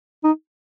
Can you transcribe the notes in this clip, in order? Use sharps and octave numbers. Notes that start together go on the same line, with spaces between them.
D#4